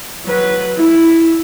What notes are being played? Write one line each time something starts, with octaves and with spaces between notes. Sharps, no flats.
F#3 B4
E4